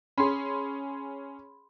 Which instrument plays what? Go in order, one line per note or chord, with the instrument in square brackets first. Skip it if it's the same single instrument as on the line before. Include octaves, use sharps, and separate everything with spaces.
[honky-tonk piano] C#4 G#4 [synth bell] B5 C6